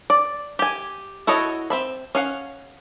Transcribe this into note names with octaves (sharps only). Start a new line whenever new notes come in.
D5
G4 G#5
E4 F#4 A4 C#5 D#5
C4 E5 B5
C#4 F5 F#5